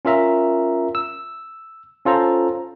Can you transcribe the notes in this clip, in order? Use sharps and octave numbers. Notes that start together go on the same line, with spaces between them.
C#4 F4 A#4 E5 A#5
E6
C#4 F4 A4 C5 A#5